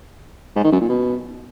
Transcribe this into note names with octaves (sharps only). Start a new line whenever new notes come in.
G#2
D#3
F#2
A#2
B2